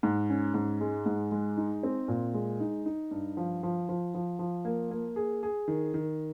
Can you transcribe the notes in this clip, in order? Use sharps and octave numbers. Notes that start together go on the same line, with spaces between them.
G#2
C#4
G#2
G#3
G#2
G#3
D#4
C4
A#2
G#3
D#4
D#4
G2
F3
F3
F3
F3
F3
A#3
A#3
G#4
G#4
D#3
D#3